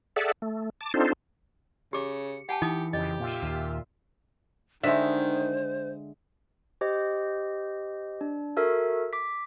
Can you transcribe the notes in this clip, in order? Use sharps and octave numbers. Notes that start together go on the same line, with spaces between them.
G#4 A4 D5 E5 F#5
A3
A5 D6
C4 D4 D#4 F4 A4 C5
C#3 G4 D6 C#7
G4 F#5 G#5 A5
E3 D#4 D#6
F2 C#3 G4 D#5
A#2 F4 E5
D#2
D3 D#3 G#3 C5 E5
G4 C5 D#5
D4
F#4 A4 A#4 E5
D6 B6